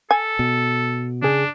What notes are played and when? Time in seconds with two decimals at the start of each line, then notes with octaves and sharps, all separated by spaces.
0.11 A4 G#5
0.39 B2
1.22 C#3 D4 G#4